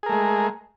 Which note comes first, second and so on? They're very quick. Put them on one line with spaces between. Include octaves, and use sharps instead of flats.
G#4 A#4 A3 G#3